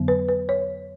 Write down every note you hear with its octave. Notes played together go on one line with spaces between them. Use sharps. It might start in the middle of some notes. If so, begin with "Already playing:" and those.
Already playing: F2 D3 F#3 B3
B4
B4
C#5